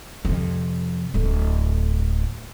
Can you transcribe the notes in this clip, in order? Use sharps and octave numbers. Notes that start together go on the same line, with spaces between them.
F2 C3
D1 A3